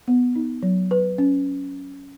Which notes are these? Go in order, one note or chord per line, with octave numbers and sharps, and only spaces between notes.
B3
D#4
F#3
B4
C#4